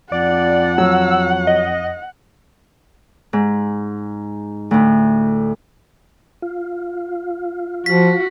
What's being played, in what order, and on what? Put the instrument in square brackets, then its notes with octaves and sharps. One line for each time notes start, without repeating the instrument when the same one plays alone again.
[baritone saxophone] F2 [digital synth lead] D5 [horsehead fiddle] F#5
[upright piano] F#3 [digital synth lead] E6
[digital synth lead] D#5
[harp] G#2
D2 A2
[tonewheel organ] F4
[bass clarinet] F3 [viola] F#4 [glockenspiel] B6